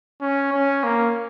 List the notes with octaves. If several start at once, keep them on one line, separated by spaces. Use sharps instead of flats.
C#4
C#4
A#3